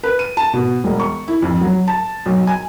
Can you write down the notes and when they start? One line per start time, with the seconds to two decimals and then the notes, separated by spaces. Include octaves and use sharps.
0.03 B4
0.19 D#7
0.37 A5
0.53 B2
0.84 E1
1.00 C#6
1.28 E4
1.42 F2
1.61 F#3
1.88 A5
2.26 B1
2.47 G#5